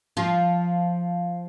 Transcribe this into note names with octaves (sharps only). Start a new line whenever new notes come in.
F3 F4